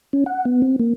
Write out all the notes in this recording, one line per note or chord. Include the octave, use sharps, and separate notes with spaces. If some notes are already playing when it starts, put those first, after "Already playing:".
C#4
F#5
B3
C4
A#3